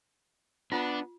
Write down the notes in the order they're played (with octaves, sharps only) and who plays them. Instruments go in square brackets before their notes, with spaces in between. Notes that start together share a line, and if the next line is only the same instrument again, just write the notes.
[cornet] B3 [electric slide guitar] D4 [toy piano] F4